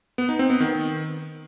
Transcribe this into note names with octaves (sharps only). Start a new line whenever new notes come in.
B3
D#4
C4
B3
D#3